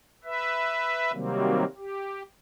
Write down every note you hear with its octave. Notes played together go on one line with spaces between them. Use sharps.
B4 E5
C3 D#3 F#3 G3 A#3 C4
G4